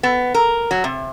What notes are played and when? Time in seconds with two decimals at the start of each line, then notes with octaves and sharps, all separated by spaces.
0.03 B3
0.34 A#4
0.71 F#3
0.84 C3